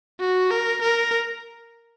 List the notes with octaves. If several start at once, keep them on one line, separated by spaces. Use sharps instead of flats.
F#4
A#4
A#4